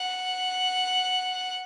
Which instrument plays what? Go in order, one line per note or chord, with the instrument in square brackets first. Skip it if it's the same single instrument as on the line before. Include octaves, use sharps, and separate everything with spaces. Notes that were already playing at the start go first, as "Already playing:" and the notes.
Already playing: [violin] F#5